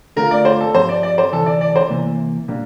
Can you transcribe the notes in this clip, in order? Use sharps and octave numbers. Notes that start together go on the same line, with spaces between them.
D3 A3 C4 F4 A#4
D5
C5
A4
G2 F3 C4 G4 C5
D5
D5
C5
D2 C3 E3 A4
D5
D5
C5
C3 E3 A#3
A#2 G3 A#3 D4